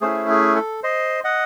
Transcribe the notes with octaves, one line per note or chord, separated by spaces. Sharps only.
A3 C#4 E4 G#4 C5
G#4
A4
C5 D#5
D#5 F#5